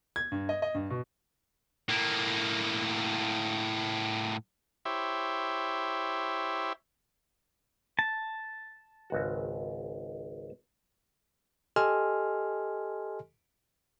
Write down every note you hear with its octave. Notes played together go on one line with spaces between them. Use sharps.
G#6
G2
D#5
D#5
G2
B2
A2 A#3
E4 G4 C5 C#5 E5
A5
G#1 C#2 F#4
G4 A4 D#5 G#5 C6 F6